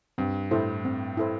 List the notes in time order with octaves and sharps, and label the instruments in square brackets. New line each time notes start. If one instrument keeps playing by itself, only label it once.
[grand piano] G2 [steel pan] C4
[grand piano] A2 [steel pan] E4 A4 C5
[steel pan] C4
E4 A4 C5